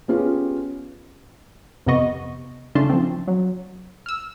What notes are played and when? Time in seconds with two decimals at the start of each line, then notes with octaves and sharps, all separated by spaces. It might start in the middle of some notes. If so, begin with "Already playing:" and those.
0.08 B3 C#4 F4 G4 G#4
1.86 F2 C3 B3 D#5 C#6
2.75 C#3 A3 C#4 D4 A5 C6
2.90 F3 C4
3.28 F#3
4.06 E6 F6